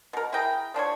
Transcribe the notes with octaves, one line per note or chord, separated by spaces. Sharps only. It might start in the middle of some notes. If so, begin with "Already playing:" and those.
B2 A#4
E4 G#4 G5 A#5
F3 D4 C5 C#5